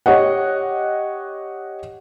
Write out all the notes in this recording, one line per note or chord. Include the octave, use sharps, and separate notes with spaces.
G4 C#5 D#5 F#5